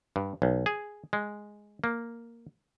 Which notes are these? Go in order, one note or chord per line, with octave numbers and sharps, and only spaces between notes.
G2
B1
G#4
G#3
A#3